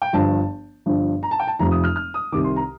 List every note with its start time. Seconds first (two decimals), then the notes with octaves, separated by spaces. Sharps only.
0.02 G5
0.13 G1 G2 F3 A5
0.86 G1 G2 F3
1.23 A#5
1.31 A5
1.40 G5
1.47 A5
1.59 F1 F2 C3 F3 A#5
1.71 D#6
1.84 F6
1.96 F6
2.14 D#6
2.32 C2 C3 D#3 D6
2.44 C6
2.56 A#5